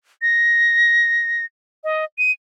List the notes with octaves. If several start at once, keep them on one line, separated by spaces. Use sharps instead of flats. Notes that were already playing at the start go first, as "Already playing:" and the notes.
A#6
D#5
D#7